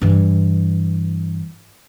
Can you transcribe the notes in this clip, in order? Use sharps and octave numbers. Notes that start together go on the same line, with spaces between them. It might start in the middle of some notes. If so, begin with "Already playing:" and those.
G2 E3